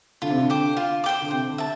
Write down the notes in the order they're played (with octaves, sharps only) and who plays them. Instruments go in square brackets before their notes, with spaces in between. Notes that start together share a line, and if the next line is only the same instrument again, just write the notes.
[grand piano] D3 [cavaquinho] F4
[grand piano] C3
D3
[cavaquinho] C5 G5 D6
F4
C5 G5 D6
[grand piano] D3
[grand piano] C3 [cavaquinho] C5
[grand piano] D3
[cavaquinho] E5 A5